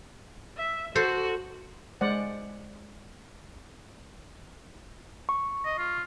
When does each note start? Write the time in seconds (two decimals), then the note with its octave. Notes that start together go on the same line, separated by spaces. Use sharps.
0.57 E5
0.95 F#4 A4 C5
2.01 G#3 C5 D5 F#5
5.29 C#6
5.65 D#5
5.78 F4